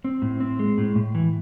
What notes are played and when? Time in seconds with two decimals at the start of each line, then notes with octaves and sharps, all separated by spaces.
0.05 C4
0.22 A2
0.40 C4
0.59 G#3
0.78 A2
0.95 A2
1.15 E3